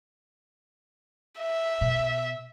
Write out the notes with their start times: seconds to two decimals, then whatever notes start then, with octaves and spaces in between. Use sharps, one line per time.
1.40 E5
1.81 B2